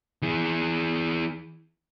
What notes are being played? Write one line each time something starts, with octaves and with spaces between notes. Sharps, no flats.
E3 G#4